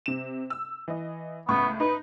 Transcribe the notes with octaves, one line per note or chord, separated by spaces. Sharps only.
C3 E7
E6
E3 D#5
C#2 A2 B3 C#6
D#4 B4